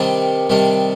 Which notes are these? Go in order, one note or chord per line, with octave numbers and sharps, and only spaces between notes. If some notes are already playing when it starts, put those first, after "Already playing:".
Already playing: C3 D#3 G3 D4
C3 D#3 G3 D4